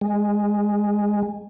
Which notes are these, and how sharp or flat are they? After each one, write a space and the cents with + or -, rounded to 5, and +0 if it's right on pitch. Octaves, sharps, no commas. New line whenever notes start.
G#3 -10